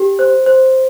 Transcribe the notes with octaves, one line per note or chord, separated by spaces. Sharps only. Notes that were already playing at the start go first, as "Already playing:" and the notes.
Already playing: G4
C5
C5